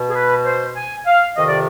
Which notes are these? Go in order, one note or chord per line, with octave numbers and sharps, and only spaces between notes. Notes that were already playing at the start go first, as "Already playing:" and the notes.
Already playing: B2
G#4
B4
C5
G#5
F5
F2 C3 D#3 D#5
D5